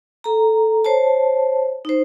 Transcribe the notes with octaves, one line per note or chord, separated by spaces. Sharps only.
A4 A#5
C5 C#5 A5
D#4 C5